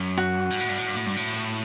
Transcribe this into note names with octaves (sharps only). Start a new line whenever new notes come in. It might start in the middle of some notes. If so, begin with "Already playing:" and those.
Already playing: F#2
F#4
G2
A2
G2
A2
G2
A2
G2
A2